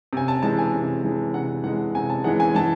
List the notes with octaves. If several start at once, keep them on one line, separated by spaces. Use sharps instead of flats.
C3 G#5
A5
E3 G#3 A5
G#5
C3
E3 G#3
C3 F#5
E3 G#3 F#5
C3 G#5
A5
E3 G#3 F#5
G#5
E3 A5